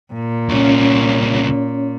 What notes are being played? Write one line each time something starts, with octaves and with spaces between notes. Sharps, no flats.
A#2
C2 C#3 C#4 C#5